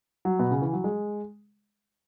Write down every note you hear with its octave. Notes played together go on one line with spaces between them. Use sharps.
F#3
B2
C#3
E3
F#3
G#3